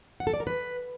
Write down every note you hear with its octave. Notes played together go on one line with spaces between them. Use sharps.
F#5
A4
D5
A#4
B4